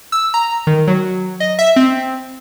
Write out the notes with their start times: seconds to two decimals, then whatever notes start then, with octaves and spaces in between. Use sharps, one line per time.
0.12 E6
0.34 A#5
0.67 D#3
0.88 F#3
1.40 D#5
1.59 E5
1.76 C4